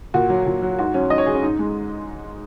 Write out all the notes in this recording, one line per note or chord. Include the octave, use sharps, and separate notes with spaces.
A#2 F#4
F#3
A#2
F#3
G#2 F#4
F#3 C#4
G#2 D#5
C#5
F#3 G#4
C#4
G#2 D#4
G#3